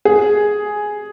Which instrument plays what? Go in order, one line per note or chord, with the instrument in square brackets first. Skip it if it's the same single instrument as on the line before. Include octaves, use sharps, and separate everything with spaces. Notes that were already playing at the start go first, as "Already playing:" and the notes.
[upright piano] G#4